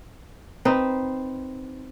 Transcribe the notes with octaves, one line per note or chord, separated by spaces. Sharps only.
C4 D#4 B4